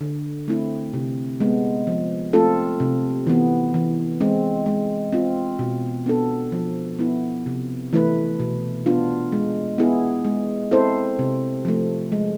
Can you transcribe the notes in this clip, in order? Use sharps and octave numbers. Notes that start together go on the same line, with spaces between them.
D3
A3 C4 E4
C3
G#3 B3
F3
A3 C4 F4 A4
C3
E3 B3
E3
G#3 C4
G#3
C4 F4
B2
B3 D4 A4
F3
B3 E4
C3
E3 A3 E4 B4
B2
B3 D4 F4
G#3
B3 E4 G#4
G#3
C4 E4 A4 C5
C3
F3 A3
G#3